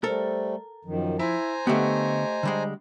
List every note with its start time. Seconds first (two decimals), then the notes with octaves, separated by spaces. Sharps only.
0.04 G3 A3 A4 A#4 C5
0.85 F#2 D#3 F3
1.19 E4 C5 G#5 A#5
1.67 D3 A3 B3 G4 D#5
2.43 D3 G3 G#3